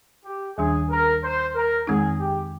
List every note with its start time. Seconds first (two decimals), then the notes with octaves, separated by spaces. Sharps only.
0.25 G4
0.58 D#2 D#3 G3 D4 G#4
0.90 A#4
1.23 C5
1.55 A#4
1.87 F2 D#3 G#3 C4 D#4 G#4
2.20 G4